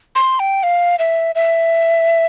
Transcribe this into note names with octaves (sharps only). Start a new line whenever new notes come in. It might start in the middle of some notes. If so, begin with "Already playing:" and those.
C6
G5
F5
E5
E5